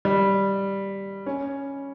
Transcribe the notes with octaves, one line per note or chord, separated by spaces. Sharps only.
G3
C#4